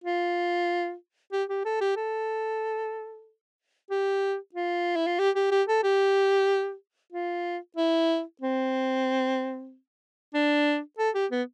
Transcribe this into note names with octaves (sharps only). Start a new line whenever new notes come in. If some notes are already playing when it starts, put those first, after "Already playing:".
F4
G4
G4
A4
G4
A4
G4
F4
E4
F4
G4
G4
G4
A4
G4
F4
E4
C4
D4
A4
G4
B3